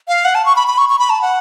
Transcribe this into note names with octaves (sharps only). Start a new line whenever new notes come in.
F5
F#5
A5
C#6
B5
B5
C#6
C#6
B5
A5
F#5